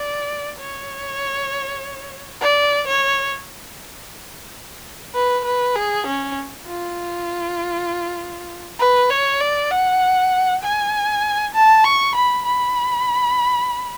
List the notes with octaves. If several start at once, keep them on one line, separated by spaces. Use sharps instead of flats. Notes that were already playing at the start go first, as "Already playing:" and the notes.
Already playing: D5
C#5
D5
C#5
B4
B4
G#4
C#4
F4
B4
C#5
D5
F#5
G#5
A5
C#6
B5
B5